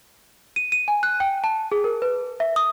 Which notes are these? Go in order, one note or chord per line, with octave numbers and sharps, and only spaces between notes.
D#7
D#7
G#5
F#6
G5
A5
G#4
A#4
B4
E5
D#6